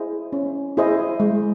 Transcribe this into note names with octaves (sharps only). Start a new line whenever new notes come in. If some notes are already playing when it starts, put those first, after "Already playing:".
Already playing: E4 G#4 C5 D#5
C#4
E4 G#4 C5 D#5
G#3